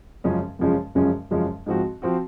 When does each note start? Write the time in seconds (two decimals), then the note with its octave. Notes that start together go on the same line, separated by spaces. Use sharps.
0.24 F#2 C#3 F3 G#3 C#4
0.59 F#2 C#3 F3 G#3 C#4
0.95 F#2 C#3 F3 G#3 C#4
1.31 F#2 C#3 F3 G#3 C#4
1.66 G#2 F3 C4 F#4
2.02 F3 C4 F#4